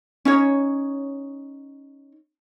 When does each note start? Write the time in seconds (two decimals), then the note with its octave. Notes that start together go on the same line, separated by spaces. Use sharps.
0.25 C#4 D#4 C#5